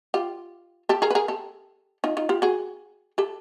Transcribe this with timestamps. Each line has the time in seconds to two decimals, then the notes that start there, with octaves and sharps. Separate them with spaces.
0.14 F4 G4
0.89 G4 A4
1.02 G#4 A#4
1.11 B4
1.15 G#4 A#4
1.28 G4 A4
2.04 D#4 F4
2.17 D#4 F4
2.29 F4 G4
2.42 F#4 G#4
3.18 G4 A4